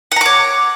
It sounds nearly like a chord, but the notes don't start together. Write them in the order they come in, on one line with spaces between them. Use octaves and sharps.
F#5 A#5 D6 C#5